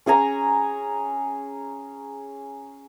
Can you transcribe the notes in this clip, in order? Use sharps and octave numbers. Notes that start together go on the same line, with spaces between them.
C#4 G#4 G#5 A#5